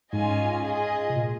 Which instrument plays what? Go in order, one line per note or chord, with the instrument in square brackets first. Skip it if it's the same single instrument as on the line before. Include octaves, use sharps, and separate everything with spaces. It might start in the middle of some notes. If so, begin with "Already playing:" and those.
[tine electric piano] G#2 [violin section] C#4 F4 G#4 D#5 G#5
[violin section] F4 G#4 D#5
[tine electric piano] C3
A#2